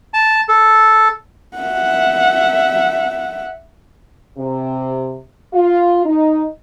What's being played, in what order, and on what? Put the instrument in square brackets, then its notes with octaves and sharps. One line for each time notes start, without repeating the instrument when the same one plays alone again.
[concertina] A5
A4
[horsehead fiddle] E5 F#5
[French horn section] C3
F4
D#4